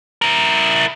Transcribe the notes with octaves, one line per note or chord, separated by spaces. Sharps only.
E4 A#4